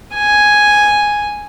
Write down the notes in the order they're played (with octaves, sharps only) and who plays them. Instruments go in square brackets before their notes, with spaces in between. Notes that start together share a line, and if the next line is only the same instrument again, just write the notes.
[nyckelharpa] G#5